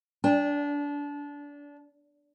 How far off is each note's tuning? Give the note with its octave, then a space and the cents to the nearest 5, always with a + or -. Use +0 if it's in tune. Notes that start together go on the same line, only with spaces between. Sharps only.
D4 -25 G5 +25